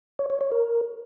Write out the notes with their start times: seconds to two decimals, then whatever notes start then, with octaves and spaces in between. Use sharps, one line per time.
0.19 C#5
0.30 C#5
0.41 C#5
0.52 A#4